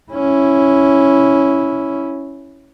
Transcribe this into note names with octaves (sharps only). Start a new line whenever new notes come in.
C#4 E4